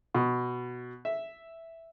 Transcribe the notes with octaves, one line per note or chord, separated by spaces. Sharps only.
B2
E5